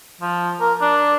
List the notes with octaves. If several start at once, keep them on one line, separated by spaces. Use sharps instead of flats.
F3
A#4
D4